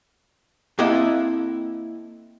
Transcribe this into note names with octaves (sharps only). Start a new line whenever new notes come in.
A#3 C4 E4 A4 D#5 F#5